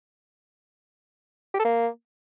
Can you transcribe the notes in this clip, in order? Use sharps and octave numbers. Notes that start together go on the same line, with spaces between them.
G4
A4
A#3